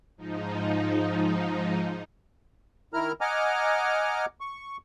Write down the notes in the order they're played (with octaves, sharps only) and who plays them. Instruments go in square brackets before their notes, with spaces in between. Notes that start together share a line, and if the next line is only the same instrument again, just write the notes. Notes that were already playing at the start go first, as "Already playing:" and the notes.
[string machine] G#2 F3 D#4
[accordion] D#3 E4 A#4 A#5 F6
D#5 F#5 G#5 A#5 D6 F6
C#6